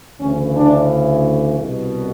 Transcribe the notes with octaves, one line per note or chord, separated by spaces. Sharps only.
D2 C#3 E3 C#4
D4
C2 B2